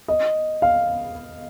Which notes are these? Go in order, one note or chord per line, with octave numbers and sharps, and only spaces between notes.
D#5
F5